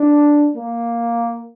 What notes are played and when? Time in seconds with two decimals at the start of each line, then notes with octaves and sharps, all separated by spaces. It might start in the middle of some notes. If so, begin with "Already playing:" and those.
Already playing: D4
0.56 A#3